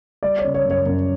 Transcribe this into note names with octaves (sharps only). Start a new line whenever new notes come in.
G3 D5
C#5
C#3
C#5
F#2
C#5
F#2